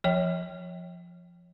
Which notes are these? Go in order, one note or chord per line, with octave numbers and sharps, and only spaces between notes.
F3 C#5 G5